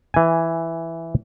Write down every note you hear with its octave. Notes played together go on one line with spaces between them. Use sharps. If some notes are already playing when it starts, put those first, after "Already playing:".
E3 G#5